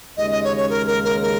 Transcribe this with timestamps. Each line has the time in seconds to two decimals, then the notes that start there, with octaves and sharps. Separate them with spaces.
0.17 D#2 C#3 G#3 C#4 D#5
0.31 D#5
0.44 C#5
0.57 C#5
0.70 A#4
0.87 A#4
1.05 A#4
1.22 A#4